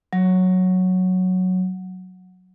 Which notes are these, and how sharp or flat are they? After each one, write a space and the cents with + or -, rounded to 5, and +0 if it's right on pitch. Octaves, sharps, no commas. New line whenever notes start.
F#3 -5